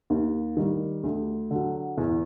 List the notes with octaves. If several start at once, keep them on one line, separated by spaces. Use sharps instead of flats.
D#2
D#3 G3
D2
D3 F#3
E2